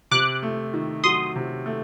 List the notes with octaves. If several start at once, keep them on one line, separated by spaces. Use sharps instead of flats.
C3 D6 F#6
A3
D#3
F#3 C6 D#6
C3
A3